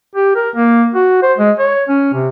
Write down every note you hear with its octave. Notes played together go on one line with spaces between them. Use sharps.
G4
A#4
A#3
F#4
C5
G#3
C#5
C#4
C3